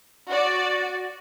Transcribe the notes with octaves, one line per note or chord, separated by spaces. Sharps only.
F#4 D5